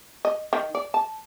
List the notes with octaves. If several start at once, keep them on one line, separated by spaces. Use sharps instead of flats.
D#5
D#3
D5
A5